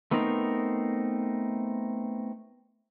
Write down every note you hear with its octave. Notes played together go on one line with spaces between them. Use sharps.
A3 B3 C4 D#4 A#4